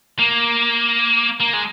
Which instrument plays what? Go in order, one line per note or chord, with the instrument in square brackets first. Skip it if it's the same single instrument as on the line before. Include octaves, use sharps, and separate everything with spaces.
[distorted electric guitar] A#3
A#3
G#3